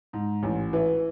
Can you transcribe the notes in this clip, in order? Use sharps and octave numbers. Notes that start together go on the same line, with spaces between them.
G#2
A1
E3